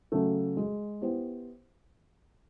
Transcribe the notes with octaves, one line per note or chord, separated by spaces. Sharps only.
C#3 F#3 A3
G#3
B3 E4 G4 C5